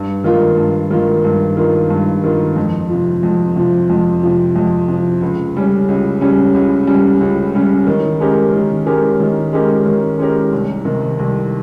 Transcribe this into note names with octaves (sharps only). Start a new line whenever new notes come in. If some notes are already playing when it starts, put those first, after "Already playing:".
Already playing: G2
D#3 A#3 F4
G2
D#3 A#3 F4
G2
D#3 A#3 F4
G2
D#3 A#3 F4
F2
C3 F3
F2
C3 F3
F2
C3 F3
F2
C3 F3
C#2
C#3 G3 C#4
C#2
C#3 G3 C#4
C#2
C#3 G3 C#4
C#2
C#3 G3 C#4
D#3
G#3 C#4 G4 A#4
D#3
G#3 C#4 G4 A#4
D#3
G#3 C#4 G4 A#4
D#3
G#3 C#4 G4 A#4
C2
C3 D#3
C2